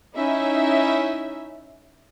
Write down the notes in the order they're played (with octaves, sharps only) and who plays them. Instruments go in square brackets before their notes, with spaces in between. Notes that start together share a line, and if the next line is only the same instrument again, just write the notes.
[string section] C#4 D#4 E4 E5